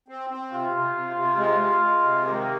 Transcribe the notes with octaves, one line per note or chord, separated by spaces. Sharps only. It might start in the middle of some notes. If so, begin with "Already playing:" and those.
C4
C4
C3 F4
C3
C3
C3
G#3 F4
G#3
G#3
C3
D#3 A#3